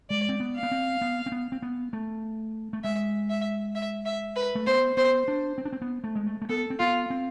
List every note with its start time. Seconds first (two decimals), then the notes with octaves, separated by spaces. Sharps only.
0.10 G#3 D5
0.29 C4
0.40 B3
0.56 F5
0.63 B3
0.71 C4
1.01 B3
1.26 C4
1.32 B3
1.52 C4
1.62 B3
1.93 A3
2.73 A3
2.84 G#3 E5
3.30 E5
3.75 E5
4.06 E5
4.36 B4
4.55 A3
4.67 B3 C5
4.97 B3 C5
5.28 D4
5.58 C4
5.65 D4
5.73 C4
5.82 B3
6.04 A3
6.15 G#3
6.27 A3
6.42 A3
6.49 B3 A4
6.70 C4
6.79 B3 F4
7.10 C4